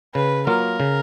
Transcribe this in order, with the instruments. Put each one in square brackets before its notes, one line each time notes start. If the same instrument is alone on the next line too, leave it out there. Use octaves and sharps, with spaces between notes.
[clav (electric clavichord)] C#3 [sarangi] B4
[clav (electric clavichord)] F#3 A#3 F4 [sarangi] A#4
[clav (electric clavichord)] C#3